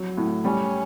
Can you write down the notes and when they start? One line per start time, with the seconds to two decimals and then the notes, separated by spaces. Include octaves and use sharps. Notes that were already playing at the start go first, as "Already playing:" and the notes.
Already playing: F#3
0.17 A2
0.45 G3 C#4